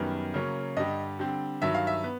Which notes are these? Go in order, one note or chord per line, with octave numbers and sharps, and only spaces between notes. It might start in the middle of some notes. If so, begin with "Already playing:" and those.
Already playing: F#2 D#3 G3 B3
C#3 F#3 A#3 C#4
G2 D3 G3 D#5
D3 G3 C4
G2 D#3 F#3 E5
F5
E5
B3